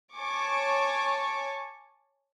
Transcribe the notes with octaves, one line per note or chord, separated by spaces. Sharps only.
C#5 G#5 A5 C#6 D6